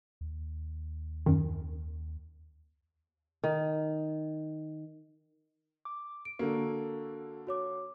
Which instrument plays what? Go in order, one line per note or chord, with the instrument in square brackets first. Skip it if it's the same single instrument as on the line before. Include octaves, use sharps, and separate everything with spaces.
[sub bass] D#2
[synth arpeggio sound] F#2 D#3
[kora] D#3
[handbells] D6
[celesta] D7
[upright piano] D3 A#3 [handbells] F#4 A4
[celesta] F#4 C#5 D6